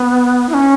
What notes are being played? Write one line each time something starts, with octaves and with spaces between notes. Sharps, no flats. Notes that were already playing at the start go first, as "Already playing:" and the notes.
Already playing: B3
E4
C#4